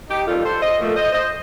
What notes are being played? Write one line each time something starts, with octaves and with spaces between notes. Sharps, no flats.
D#4 G4
F2 D#3 G3 F4 A4
A4 C5
C5 D#5
A#2 F3 A3
C5 D#5
C5 D#5